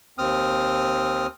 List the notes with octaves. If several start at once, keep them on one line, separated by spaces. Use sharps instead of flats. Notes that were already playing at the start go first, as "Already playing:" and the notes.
D#2 C4 D#6 F6